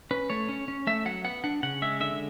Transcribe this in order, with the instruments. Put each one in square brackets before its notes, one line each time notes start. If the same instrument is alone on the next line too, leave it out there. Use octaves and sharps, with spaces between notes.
[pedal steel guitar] C#4 B4
A3 C#5
C#4
C#4
A3 E5
F#3 F#5
B3 F#5
D4 F#5
C#3 F#5
G#3 E5
D3 E5